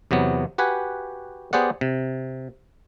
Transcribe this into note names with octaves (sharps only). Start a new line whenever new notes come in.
E2 C3 F#3 B3
F#4 G4 B4 F#5 G#5
B3 G4 G#4 C5 D5 F#5
C3